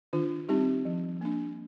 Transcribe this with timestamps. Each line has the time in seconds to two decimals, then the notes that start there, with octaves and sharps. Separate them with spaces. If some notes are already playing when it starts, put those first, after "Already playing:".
0.13 D#3 D4 F4
0.49 G3 C4 D#4 G4
0.85 F3
1.21 A#3 D4